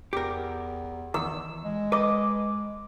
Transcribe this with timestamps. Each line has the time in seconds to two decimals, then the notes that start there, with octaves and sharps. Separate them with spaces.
0.13 E2 G4 A#4
1.14 E2 D#3 E6
1.65 G#3
1.92 B4 D#5 D6